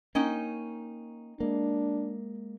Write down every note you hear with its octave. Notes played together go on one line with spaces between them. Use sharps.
A#3 C#4 D#4 G5
G#3 A#3 D4